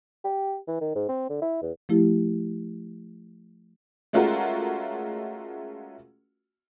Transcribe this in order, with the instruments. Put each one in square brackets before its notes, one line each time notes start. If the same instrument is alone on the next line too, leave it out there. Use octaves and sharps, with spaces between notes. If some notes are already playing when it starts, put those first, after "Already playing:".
[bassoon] G4
E3
D#3
G#2
C4
D3
E4
E2
[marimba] F3 A3 E4 G4
[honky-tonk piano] G#3 A3 C#4 F4 F#4 A#4